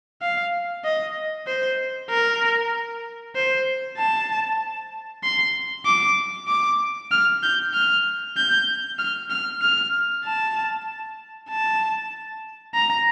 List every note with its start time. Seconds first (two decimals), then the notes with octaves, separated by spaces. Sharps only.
0.22 F5
0.84 D#5
1.47 C5
2.10 A#4
3.36 C5
3.97 A5
5.23 C6
5.86 D6
6.48 D6
7.12 F6
7.43 G6
7.74 F6
8.37 G6
8.99 F6
9.30 F6
9.62 F6
10.25 A5
11.50 A5
12.74 A#5